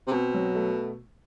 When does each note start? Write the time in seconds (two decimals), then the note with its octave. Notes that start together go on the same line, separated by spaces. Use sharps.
0.07 C3
0.12 B2 C4
0.34 F#3
0.55 A3